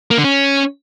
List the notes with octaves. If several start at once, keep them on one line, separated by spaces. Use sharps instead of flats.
A#3
D3
C#4